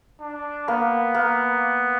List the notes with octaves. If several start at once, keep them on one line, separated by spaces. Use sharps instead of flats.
D4
A#3 B3
A#3